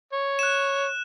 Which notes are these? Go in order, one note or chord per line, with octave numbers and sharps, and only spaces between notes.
C#5
F#6 E7